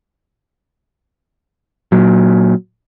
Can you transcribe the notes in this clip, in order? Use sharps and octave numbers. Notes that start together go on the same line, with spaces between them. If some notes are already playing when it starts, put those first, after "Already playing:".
A#2 F#3